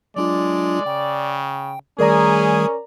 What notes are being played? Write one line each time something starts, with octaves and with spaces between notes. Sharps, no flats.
F#3 G#3 D4 F4 D5
C#3 G5
D#3 G3 A3 C#4 G#4 A#4 D5 A#5